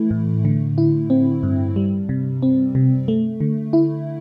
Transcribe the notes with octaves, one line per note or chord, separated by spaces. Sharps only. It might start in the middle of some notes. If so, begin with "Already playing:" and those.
Already playing: E3 A3 E4
A2
D3
E4
C4
G2
G3
C3
C4
C3
A3
D3
E4